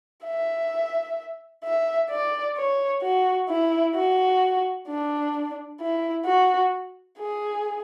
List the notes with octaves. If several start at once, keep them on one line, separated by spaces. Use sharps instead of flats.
E5
E5
D5
C#5
F#4
E4
F#4
D4
E4
F#4
G#4